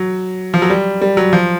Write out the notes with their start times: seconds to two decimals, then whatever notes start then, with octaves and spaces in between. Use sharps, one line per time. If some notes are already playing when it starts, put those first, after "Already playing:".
Already playing: F#3
0.54 F3
0.62 F#3
0.70 G3
1.01 G3
1.17 F#3
1.33 F3